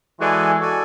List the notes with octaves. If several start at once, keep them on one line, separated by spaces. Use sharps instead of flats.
E3 G#3 F#4 A4 D5 G#5
F#4 A4 D5 G#5